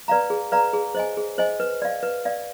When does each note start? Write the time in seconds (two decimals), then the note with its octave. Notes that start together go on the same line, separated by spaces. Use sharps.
0.08 B4 D5 F5 A#5
0.30 G#4
0.52 B4 D5 F5 A#5
0.73 G#4
0.95 C5 D#5 G#5
1.17 G#4
1.38 C5 D#5 G#5
1.60 B4
1.82 D5 F5
2.03 B4
2.25 D5 F5